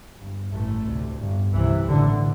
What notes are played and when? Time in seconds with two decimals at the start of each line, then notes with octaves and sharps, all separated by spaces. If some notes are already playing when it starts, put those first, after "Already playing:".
0.17 G1 G2
0.51 A1 A2 A3
0.85 D2 C3
1.20 G1 G2
1.54 C2 C3 E3
1.88 A1 A2 D3